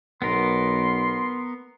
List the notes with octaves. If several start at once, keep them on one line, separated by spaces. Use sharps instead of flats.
B1 B3 A#4 C6